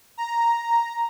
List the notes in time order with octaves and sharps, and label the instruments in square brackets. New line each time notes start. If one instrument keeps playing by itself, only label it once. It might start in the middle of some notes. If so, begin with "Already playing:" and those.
[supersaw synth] A#5